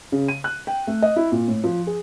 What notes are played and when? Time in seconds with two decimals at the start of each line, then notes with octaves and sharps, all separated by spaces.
0.12 C#3
0.28 D#7
0.44 F#6
0.67 G5
0.87 A3
1.02 D#5
1.16 E4
1.32 A#2
1.48 A2
1.64 F3
1.87 G#4